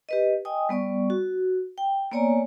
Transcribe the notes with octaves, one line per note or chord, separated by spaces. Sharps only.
G4 B4 D#5
D#5 G5 G#5 D#6
G3 B3 D5 C#6
F#4
G5
A#3 B3 C#5 D5 G#5 A#5